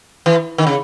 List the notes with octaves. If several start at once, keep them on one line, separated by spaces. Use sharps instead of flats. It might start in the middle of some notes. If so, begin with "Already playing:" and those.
E3
D#3
C#3